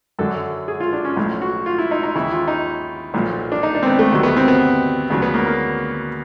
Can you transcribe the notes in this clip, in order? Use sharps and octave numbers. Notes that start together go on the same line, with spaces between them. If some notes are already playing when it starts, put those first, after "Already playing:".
F#2 D3 F#3 A4
G#4
F4
D4
C#4
B1 A2 F3
F#4
F4
E4
D#4
D#4
D#2 C#3 E3 E4
F4
D#4
B1 A#2 F3
D4
D#4
D4
C4
B3
A3
D2 C3 D#3 F#3
B3
C4
B3
D2 C#3 F#3
B3
A#3
A#3